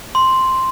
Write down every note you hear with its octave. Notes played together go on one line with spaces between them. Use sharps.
C6